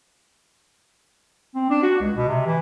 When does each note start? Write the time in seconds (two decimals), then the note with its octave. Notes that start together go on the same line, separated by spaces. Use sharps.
1.55 C4
1.70 D4
1.83 F#4
2.01 C#2
2.16 B2
2.28 C3
2.46 E3